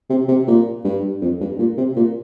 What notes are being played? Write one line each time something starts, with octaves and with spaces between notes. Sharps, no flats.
C3
C3
A#2
G2
F2
G2
A#2
C3
A#2